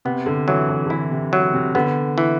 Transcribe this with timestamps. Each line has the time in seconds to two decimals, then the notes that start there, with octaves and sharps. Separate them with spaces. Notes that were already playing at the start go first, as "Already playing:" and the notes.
0.05 C3 B3
0.26 D3
0.48 E3 F#3
0.69 E3
0.86 D3
0.90 E3 E4
1.11 C3
1.33 F#3
1.53 C3
1.75 D3 B3
2.18 E3